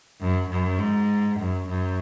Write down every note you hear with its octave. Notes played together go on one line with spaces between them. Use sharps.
F#2
F#2
G#2
F#2
F#2